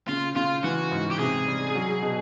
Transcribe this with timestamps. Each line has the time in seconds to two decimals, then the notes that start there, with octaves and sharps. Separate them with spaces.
0.08 C#3 F4
0.36 C#3 F4
0.64 E3 F#4
0.92 G#2
1.11 G4
1.19 C3 G#4
1.47 G3
1.75 F#3
2.02 B2